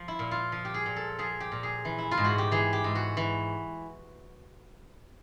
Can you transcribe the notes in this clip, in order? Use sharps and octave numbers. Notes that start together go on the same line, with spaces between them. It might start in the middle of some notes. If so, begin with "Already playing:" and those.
Already playing: F3
E4
A#2
F4
F3
G4
G#4
A#2
A4
F3 G#4
G4
A#2
G#4
E3
E4
F4
G#2
F#4
G4
E3 G#4
G4
G#2
F#4
E3